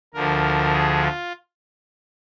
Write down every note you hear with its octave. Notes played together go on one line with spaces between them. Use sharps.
D2 D3 F3 A#4
G#4
F4